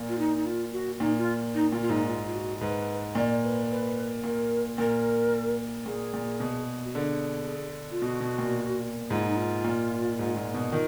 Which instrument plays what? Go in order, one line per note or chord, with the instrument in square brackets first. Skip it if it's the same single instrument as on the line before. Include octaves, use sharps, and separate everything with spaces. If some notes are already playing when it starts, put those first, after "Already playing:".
Already playing: [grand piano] A#2
[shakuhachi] F4
D#4
D#4
F4
F#4
[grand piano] A#2 [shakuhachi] D#4
[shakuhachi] F4
D#4
[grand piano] A#2 [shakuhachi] F4
[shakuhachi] F4
[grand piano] G#2 [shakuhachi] D#4
[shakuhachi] F4
F4
F#4
[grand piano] G#2 [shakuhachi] B4
[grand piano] A#2 [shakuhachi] D5
[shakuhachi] B4
B4
[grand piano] A#2 [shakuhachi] A#4
[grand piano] A#2 [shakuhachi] A#4
[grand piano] A#2 [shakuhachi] G#4
[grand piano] A#2
B2
[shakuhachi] F#4
[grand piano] D3 [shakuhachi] G#4
[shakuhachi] F4
[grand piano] B2 [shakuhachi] F#4
[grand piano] B2
A#2
[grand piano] G#2 [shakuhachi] F4
[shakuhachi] D#4
F4
[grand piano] A#2
G#2
A#2
B2
[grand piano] D#3 [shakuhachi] F4